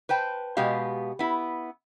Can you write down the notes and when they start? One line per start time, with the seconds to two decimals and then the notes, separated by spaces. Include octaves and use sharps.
0.09 B4 C5 G5 A5
0.57 B2 G#3 B3 G4 F5
1.19 B3 E4